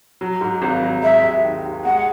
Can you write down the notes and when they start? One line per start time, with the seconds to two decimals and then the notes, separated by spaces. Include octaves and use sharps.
0.21 F#3
0.41 G#2
0.62 G#1
0.82 F#3
1.03 G#3 E5
1.23 D#2
1.44 D#3
1.64 D#2
1.85 G#3 F#5